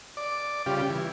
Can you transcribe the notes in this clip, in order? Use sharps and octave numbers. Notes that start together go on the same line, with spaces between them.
D5
C#3 G3 F4 G4
E3